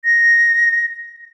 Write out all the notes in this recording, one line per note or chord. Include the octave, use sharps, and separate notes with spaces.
A#6